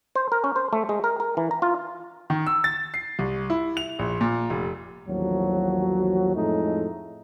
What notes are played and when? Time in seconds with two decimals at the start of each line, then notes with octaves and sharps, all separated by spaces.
0.15 C5
0.32 A#4
0.44 C#4
0.56 C5
0.73 A3
0.89 G#3
1.04 A#4
1.20 A#4
1.37 E3
1.51 A#5
1.62 F4
2.30 D#3
2.46 E6
2.64 A6
2.94 C7
3.19 C2
3.50 E4
3.77 F7
3.99 A#1
4.21 A#2
4.50 F1
5.07 A1 D#2 F3 F#3
6.35 F2 A2 G#3 A3 D#4